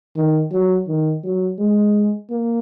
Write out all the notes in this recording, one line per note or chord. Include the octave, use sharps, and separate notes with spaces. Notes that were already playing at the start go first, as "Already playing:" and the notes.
D#3
F#3
D#3
F#3
G#3
A#3